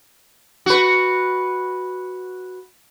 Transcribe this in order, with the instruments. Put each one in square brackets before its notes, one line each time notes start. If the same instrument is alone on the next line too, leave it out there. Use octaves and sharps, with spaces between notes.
[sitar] F#4 B4